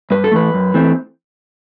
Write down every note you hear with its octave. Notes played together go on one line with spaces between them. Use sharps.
G2 B4
A4
E3 A3 B4
F#2
E3 A3 C4